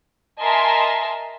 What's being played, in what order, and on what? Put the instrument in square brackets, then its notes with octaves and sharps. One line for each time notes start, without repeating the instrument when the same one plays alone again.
[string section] A#4 D#5 E5 G#5 A5 C6